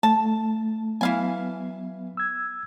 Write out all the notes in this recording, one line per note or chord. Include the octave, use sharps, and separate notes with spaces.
A3 A5
E3 F#3 B3 F5 G#5
E6 G#6